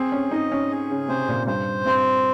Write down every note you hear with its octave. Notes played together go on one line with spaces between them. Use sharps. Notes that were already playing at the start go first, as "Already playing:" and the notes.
Already playing: C4 G#4
C#4
D#4 D#5
C#4
G#4
C#3
C3 C5
A#2
G2 C5
G2 C4